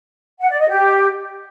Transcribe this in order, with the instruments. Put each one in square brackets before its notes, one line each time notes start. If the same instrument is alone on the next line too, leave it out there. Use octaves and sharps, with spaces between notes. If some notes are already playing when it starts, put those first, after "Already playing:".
[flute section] F#5
D5
D#5
G4